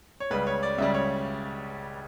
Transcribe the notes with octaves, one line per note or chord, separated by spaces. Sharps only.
C#5
C#2 C#3 G3 B4
C#5
D5
C#2 C#3 G3 E5
C#5